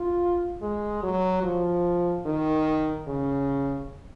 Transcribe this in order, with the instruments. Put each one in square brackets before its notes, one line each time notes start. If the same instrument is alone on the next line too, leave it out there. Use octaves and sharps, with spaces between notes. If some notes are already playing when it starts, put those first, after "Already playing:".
Already playing: [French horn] F4
G#3
F#3
F3
D#3
C#3